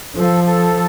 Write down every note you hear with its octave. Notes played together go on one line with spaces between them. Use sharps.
F3 A4
A4